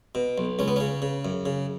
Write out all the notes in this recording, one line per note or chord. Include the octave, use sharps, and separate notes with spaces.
B2
B1
C#2 C#4
B3
C#3 C#4
C#3
F#2
C#3